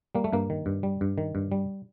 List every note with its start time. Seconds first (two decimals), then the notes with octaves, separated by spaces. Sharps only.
0.15 G3 A#3
0.24 A3
0.33 G2 A#3
0.50 D#3
0.66 G2
0.83 G3
1.01 G2
1.18 D#3
1.35 G2
1.52 G3